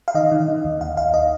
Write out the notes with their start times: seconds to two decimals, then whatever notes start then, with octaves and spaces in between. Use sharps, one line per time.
0.08 F5
0.14 D#3 D#5
0.32 D#3
0.48 D#3
0.64 D#2
0.81 D#2 F5
0.97 D#2 F5
1.14 D#5